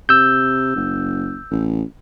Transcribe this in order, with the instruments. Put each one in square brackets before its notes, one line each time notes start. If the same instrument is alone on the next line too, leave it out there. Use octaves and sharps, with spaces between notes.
[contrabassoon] C3 [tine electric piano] E6 G6
[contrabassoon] F#1
A1